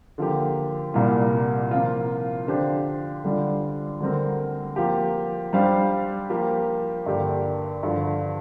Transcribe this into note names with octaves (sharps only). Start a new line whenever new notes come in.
D3 F3 A#3 G4
C2 A#2 G3 A#3 F4
C3 F3 A#3 F4
D3 F3 D4 G4 C5
D3 G3 D4 F4 D5
D2 D3 G3 C4 A#4
F3 A#3 G4
G3 D4 G4 C5 F5
F3 A#3 G4
G2 D3 A#3 G4
G2 D3 F3